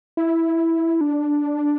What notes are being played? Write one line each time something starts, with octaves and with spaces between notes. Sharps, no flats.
E4
D4